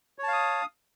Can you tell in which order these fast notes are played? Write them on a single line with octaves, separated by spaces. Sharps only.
C#5 A5 F5 D#6